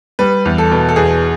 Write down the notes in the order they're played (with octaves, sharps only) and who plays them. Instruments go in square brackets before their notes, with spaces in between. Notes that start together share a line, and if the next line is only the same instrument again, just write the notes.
[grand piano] G3 B4
E2
A4
B2
A4
E2 G#4